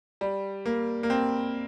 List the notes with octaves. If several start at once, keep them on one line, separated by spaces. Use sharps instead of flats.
G3
A#3
A#3
C4